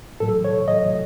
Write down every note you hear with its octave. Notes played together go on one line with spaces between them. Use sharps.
A2 F#3 A4
C#5
A2 F#3 D#5